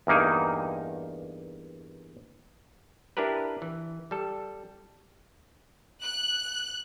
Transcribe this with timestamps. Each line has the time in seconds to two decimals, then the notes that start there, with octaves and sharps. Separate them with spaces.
0.07 E2 G2 A#3 D#4
3.17 D4 E4 G4 A#4 B4
3.62 E3
4.11 G3 A4
6.04 F#6